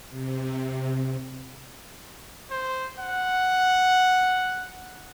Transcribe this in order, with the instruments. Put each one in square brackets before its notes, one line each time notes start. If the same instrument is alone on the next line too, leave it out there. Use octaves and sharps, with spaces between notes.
[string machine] C3
[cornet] C5
F#5